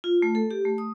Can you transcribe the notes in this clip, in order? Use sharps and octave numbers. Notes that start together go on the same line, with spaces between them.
F4
A3
A4
G4
A3
D#6